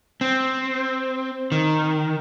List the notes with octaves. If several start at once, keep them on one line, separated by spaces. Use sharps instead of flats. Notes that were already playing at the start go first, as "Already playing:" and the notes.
C4
D#3